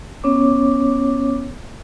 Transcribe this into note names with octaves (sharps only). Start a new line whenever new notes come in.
B3 C#4 C#5 D6